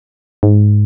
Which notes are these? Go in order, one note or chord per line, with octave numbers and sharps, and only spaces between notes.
G#2